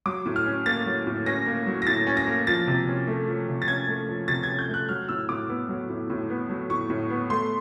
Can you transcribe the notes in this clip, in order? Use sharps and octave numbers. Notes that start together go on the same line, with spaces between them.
F#3 D6
A2
F6
C#4
A#3 A6
F#3
A2
C#4 A#6
A#3
F#3
A#6
A2 A6
C#4
A#6
A#3
F3 A6
C3
C#4
A3
F3
C3
A6
C#4 G#6
A3
F3
C3 A6
C#4 G#6
G6
A3
F#6
F#3 F6
A2 E6
A2 D6
B3
F#3
A2
A2
B3
F#3
A2 C#6
A2
B3
A3 C6